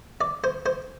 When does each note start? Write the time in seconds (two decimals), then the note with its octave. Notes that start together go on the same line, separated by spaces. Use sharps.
0.21 D5
0.44 C5
0.66 C5